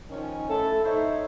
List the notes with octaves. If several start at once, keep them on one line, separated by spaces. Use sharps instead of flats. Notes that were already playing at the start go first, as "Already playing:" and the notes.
D#3 F3 C#4
A3 E4 A4
D#4 E4 C5 C#5 E5